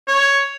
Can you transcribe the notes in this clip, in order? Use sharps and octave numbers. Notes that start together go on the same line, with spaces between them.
C#5